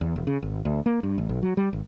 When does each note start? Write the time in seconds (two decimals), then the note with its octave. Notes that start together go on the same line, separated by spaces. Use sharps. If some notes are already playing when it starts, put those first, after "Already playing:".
0.01 E2
0.16 E1
0.27 C#3
0.42 G#1
0.65 D2
0.86 A#3
1.03 G2
1.18 A1
1.29 B1
1.43 F#3
1.57 G3
1.73 G#1